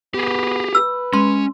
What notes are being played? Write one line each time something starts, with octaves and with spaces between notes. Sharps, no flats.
B3 G4 G#4
B4 E6
G#3 C#4 C6